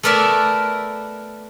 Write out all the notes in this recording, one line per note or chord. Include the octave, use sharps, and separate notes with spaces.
A3 B3 A#4 D5 E5 A5